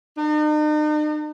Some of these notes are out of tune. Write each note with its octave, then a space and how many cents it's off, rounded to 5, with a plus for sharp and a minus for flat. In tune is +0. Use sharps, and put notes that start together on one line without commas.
D#4 -45